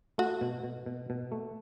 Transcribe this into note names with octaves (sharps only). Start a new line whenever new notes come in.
A3 F#4
B2
B2
B2
B2
A3